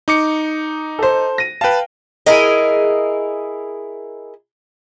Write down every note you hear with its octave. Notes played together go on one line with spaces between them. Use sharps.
D#4 D6 C#7
A4 C5
A#6 D#7
B4 F5 G5 A5
E4 G#4 A#4 D#5